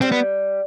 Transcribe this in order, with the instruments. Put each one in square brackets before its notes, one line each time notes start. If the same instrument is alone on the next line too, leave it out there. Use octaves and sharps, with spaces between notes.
[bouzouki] G3 [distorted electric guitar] C4
[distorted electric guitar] B3